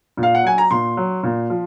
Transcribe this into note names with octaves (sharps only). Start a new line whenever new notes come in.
A#2
F5
F#5
F#3 G#5
A#5
A#2 C6
F#3
A#2
F3